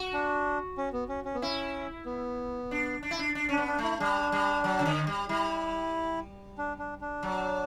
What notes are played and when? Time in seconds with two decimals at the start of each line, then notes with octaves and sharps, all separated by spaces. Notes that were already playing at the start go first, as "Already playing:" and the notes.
Already playing: F#4
0.13 D4
0.78 C#4
0.93 B3
1.09 C#4
1.25 C#4
1.35 B3
1.42 C#4 E4
2.06 B3
2.71 D4
3.03 D4
3.11 E4
3.19 D4
3.35 D4
3.49 C#4
3.52 D4
3.57 B3
3.67 D4
3.78 A3 E4
4.00 G3 D4
4.32 G3
4.64 F#3
4.79 C#3
4.85 D3
5.07 G3
5.29 G3 E4
6.58 D4
6.79 D4
7.01 D4
7.23 F#3